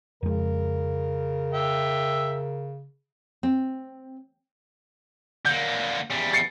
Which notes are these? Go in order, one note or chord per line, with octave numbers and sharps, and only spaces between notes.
F2 C#3 G#3 A#4
E5 G5
C4
D3 A#3 G6
E2 G3
A6 C7 C#7